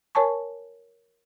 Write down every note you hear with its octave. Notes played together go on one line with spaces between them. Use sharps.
A#4 C#5 G#5 A5 C#6